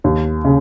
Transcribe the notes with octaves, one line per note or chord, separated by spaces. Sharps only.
D#2
C#3